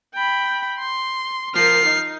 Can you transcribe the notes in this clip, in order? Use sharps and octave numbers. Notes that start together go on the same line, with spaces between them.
G5 B5
C6
F3 A#4 F6 C7
D#4